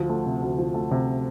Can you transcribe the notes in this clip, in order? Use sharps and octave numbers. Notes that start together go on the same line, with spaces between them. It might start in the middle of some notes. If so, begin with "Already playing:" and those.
Already playing: D2 F3
A3
C3
D2
F3
A3
C3